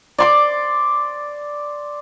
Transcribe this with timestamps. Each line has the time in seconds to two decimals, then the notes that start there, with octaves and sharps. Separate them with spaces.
0.18 D5 C6 D6